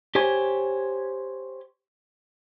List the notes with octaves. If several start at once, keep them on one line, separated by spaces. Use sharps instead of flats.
G4 C5 C#5 G#5